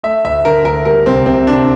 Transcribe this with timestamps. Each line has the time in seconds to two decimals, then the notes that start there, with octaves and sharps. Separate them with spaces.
0.03 A3 E5
0.25 D2 E5
0.45 D3 A#4
0.65 D2 A#4
0.85 G3 A#4
1.06 C2 C4
1.26 C3 C4
1.46 C2 D4